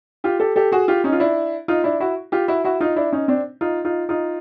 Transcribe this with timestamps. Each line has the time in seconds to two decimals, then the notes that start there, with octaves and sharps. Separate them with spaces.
0.24 F4 G4
0.40 G4 A4
0.56 G4 A4
0.72 F#4 G#4
0.88 F4 G4
1.04 C#4 D#4
1.13 F4
1.20 D4 E4
1.68 D#4 F4
1.84 D4 E4
2.00 E4 F#4
2.32 F4 G4
2.48 E4 F#4
2.64 E4 F#4
2.81 D#4 F4
2.96 D4 E4
3.13 C#4 D#4
3.28 C4 D4
3.61 D#4 F4
3.85 D#4 F4
4.09 D#4 F4